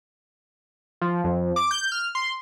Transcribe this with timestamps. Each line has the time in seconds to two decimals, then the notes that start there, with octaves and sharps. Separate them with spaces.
1.01 F3
1.24 F2
1.56 D6
1.71 G6
1.92 F6
2.15 C6